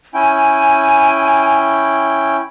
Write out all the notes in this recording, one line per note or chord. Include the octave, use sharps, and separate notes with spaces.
C#4 E4 G5 G#5